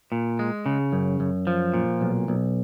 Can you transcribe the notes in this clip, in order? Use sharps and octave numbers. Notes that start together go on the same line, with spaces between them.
A#2
G#3
C#3
F#2
F#2
F3
A#2
B1
B1